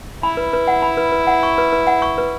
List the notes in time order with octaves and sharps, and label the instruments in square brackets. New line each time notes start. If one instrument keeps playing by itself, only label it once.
[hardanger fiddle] E4 [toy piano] B5
[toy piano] B4
B4
F#5
B5
B4
B4
F#5
C#6
B4
B4
F#5
C#6
B4